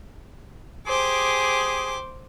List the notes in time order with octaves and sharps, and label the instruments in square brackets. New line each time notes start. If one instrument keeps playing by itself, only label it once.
[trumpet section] G4 G#4 [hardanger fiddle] C5 D6